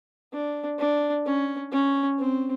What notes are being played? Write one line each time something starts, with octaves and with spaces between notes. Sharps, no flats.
D4
D4
C#4
C#4
C4